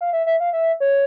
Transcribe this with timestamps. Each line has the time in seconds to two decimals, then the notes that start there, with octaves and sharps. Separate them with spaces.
0.01 F5
0.13 E5
0.26 E5
0.40 F5
0.53 E5
0.80 C#5